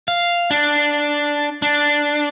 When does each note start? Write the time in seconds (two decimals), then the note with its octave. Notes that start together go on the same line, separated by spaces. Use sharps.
0.08 F5
0.51 D4
1.62 D4